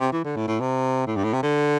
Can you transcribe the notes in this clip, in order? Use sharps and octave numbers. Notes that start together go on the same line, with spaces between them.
C3
E3
D3
A2
A2
C3
A2
G2
A2
C3
D3